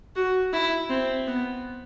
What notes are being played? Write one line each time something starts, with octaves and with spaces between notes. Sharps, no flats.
F#4
E4
C4
B3